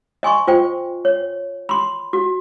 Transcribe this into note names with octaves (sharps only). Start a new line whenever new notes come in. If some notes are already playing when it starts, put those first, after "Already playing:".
D#5 G#5 C6 C#6
F4 C5 G5
C#5
B5 C6
F#4